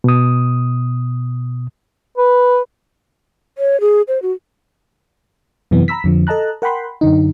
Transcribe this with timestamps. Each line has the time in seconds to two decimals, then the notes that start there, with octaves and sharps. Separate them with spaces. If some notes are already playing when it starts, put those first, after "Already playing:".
0.04 B2 D#6
2.18 B4
3.58 C#5
3.81 G#4
4.08 C5
4.22 F#4
5.71 F#2 C3 E3 B3
5.88 A#5 B5 E6 B6
6.04 F2 D3 F3
6.27 A4 D#5 A5 A#5 F#6
6.62 A#4 F#5 G5 B5 C6
7.01 F#2 D3 D#4